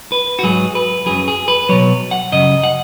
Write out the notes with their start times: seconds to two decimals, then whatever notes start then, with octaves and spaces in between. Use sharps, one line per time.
0.12 B4
0.39 F#4
0.43 G#2 F#3 G#4
0.75 B4
1.06 F#2 F#3 G#4
1.28 G#4
1.48 B4
1.69 B2 F#3 C#5
2.11 F#5
2.32 F#2 C#3 F#3 D#5
2.64 F#5